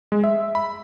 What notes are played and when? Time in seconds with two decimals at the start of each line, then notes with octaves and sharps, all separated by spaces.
0.12 G#3
0.24 E5
0.55 B5